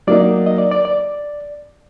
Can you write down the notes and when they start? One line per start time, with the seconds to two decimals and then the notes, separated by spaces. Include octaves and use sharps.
0.07 F#3 A#3 D#4 D5
0.46 D#5
0.58 D5
0.71 D5
0.85 D5